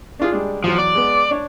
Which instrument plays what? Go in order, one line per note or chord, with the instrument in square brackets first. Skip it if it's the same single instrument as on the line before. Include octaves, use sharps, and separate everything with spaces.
[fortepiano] D4 F4 G#4
G3 G#3 D4
[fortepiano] E2 F#3 [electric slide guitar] F3
[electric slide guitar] D5
[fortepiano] G#3 B3
D4 C#5